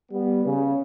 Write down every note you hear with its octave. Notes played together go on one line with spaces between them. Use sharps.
G3 B3
C#3